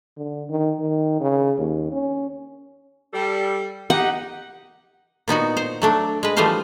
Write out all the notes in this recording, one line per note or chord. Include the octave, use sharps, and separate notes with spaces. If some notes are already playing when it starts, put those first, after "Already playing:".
D3
D#3
D#3
C#3
D#2
C#4
G3 A4
D#4 G4 F#5
A#2 B3 D#4 F#4
C5
F#3 A3 D4
G#3 B4
E3 F3 G3 A3 C5 F5